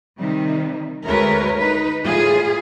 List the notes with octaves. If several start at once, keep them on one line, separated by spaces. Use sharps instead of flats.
C3 D#3 G3
D2 G#3 A3 A#4 B4 C#5
D#4 B4
A2 G3 F4 G#4